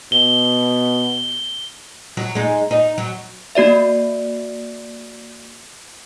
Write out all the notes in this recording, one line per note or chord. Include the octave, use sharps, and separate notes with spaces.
B2 G7
F#3
G#3 D#4
D#4
F#3
A#3 F#4 D5 E5